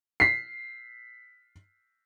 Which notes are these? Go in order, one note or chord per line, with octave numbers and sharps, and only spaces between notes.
B6 C7